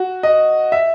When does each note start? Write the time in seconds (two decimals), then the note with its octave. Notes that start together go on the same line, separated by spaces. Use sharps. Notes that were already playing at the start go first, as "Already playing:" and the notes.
Already playing: F#4
0.23 D#5
0.72 E5